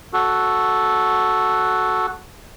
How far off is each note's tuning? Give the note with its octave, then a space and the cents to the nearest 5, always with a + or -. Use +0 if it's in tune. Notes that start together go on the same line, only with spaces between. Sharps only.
F#4 +0 A4 -5